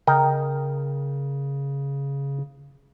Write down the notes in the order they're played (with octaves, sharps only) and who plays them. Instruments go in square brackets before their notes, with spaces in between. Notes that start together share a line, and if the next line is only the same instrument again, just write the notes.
[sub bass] C#3 [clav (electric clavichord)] A#4 D#5 G5